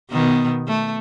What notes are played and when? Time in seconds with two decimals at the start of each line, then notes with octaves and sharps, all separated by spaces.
0.10 B2 D#3 B3
0.68 A3